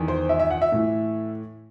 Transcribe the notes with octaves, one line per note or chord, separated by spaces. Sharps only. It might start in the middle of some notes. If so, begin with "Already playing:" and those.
Already playing: E2 D#3
C5
E5
E5
F#5
E5
A2 E3